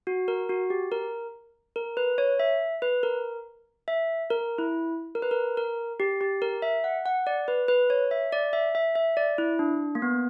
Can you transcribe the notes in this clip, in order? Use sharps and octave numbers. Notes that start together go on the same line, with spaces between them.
F#4
A#4
F#4
G4
A#4
A#4
B4
C#5
E5
B4
A#4
E5
A#4
E4
A#4
B4
A#4
A#4
G4
G4
A#4
E5
F#5
F#5
D5
B4
B4
C#5
E5
D5
E5
E5
E5
D5
E4
D4
A#3
B3